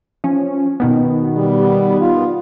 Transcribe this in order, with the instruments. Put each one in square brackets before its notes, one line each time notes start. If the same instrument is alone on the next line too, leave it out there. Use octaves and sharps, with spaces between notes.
[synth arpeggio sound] F3 C#4
B2 D#3 B3
[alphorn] G3
F4